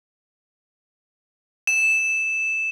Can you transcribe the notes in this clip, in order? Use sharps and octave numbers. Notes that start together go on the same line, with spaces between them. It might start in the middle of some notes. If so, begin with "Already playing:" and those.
E7